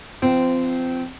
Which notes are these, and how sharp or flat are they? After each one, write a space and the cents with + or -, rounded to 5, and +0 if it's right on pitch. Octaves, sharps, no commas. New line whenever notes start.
F3 -15 C4 -20